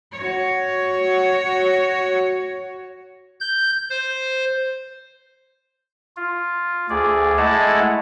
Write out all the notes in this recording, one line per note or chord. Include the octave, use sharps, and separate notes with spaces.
F#4 C#5
G6
C5
F4
D2 G#4 D5
G#3 A3 E4 F#5 A5 A#5